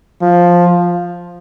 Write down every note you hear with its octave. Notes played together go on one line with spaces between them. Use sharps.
F3